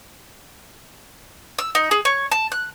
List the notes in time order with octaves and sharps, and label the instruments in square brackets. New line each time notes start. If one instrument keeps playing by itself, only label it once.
[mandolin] E6
D#4
G#4
C#5
A5
F#6